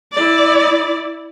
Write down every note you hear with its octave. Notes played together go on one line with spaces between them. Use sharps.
E4 D5